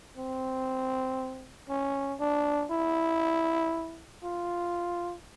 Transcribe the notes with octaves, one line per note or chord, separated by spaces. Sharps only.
C4
C#4
D4
E4
F4